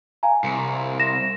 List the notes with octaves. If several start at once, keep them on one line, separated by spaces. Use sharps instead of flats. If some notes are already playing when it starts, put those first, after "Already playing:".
F5 G#5 A#5
C2
A#6 E7